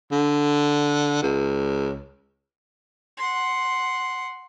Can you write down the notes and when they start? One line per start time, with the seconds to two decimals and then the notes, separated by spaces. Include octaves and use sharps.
0.12 D3
1.22 C#2
3.17 F#5 C6